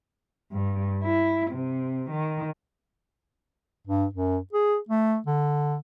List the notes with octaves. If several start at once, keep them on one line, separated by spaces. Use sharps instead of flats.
G2
E4
C3
D#3
G2
F#2
G#4
A3
D3